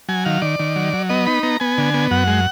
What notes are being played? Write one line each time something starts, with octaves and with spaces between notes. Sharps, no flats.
F#3 G#5
D#3 F5
D#3 D5
D#3
F#3
F#3
B3 D#5
D#4 B5
B3 A#5
B3 G#5
D3
B3
F#2 F#5
G#3